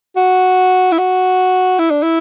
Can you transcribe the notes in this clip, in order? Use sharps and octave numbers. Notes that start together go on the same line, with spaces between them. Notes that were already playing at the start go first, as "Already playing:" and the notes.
F#4
E4
F#4
E4
D4
E4